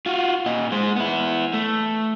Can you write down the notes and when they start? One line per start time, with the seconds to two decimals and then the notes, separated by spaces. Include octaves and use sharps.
0.06 F4 F#4
0.46 A#2 D#5
0.72 G#3 C5
0.96 B3 E4
1.54 A3